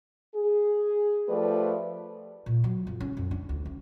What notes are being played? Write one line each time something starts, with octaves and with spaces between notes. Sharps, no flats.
G#4
F3 A3 G4 B4 D5
A#2
F#3
F2
C#4
F2
D4
D2
C#4